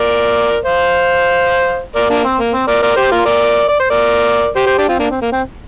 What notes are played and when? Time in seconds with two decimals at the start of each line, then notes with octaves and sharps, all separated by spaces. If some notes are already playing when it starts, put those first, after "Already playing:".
Already playing: A#4 D5
0.65 C5 F5
1.95 A#4 D5
2.10 A#3 D4
2.24 C4
2.39 A#3
2.53 C4
2.67 A#4 D5
2.82 A#4 D5
2.96 G4 C5
3.11 F4 A#4
3.25 A#4 D5
3.68 D5
3.80 C5
3.90 A#4 D5
4.56 G4 C5
4.66 G4 C5
4.78 D4 G4
4.88 C4 F4
4.99 A#3 D4
5.10 C4
5.21 A#3
5.32 C4